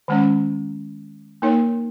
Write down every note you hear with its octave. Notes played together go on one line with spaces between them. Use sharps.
D#3 G#3 C#4
A#3 D#4 A#4 C#5